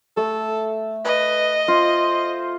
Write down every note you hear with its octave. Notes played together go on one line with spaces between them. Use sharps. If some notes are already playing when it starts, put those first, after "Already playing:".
A3 A4
B4 D#5
F4 C5